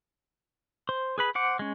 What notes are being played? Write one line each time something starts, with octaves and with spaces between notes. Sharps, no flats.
C5
G#4 B4 B5
C5 F#5 D6
G#3 C#4